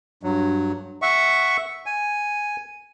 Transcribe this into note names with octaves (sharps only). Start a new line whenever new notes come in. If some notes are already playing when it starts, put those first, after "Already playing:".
G2 F#3
E5 F#5 C#6
G#5